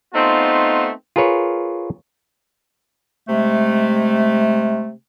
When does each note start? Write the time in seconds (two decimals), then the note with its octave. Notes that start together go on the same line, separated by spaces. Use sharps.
0.14 A3 B3 C4 D#4 F4
1.16 F4 G#4 A#4 B4 C#5
3.29 C3 G#3 A3